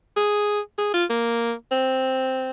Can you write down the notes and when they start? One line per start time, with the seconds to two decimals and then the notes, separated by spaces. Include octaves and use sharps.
0.17 G#4
0.78 G#4
0.94 F4
1.10 A#3
1.72 C4